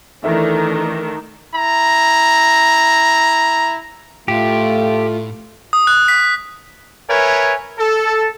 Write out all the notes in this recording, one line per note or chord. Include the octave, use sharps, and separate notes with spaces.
D#3 E3 A3 D4 A4 E5
E4 A#5
A2 A3 F4 G4
D#6
F#6
B6
A#4 B4 C#5 E5 G#5
A4